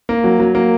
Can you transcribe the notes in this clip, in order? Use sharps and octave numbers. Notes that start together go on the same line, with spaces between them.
A#3
F#3
F#3
A#3